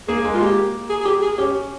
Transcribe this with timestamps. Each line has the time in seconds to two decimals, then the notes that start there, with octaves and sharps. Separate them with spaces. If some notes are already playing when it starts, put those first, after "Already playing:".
0.08 A#3 G#4
0.25 G#3
0.34 F4
0.40 A#3 G4
0.89 G#4
1.01 G#4
1.05 G4
1.22 G#4
1.38 C#4 G4